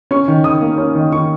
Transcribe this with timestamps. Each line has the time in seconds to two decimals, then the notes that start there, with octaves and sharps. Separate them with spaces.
0.11 C#4 C#6
0.28 D#3
0.44 D#3 D#6
0.61 A#3
0.78 C#4
0.95 D#3
1.12 D#3 C#6